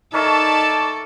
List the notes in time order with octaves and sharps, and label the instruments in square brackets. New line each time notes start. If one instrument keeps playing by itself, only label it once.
[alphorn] D#4 [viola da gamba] A4 [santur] A#4 C#5 E5 [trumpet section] D5 A5